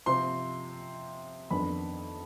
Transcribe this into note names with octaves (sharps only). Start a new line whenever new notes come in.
C3 F3 C4 C6
F2 D#3 B3 D4 B5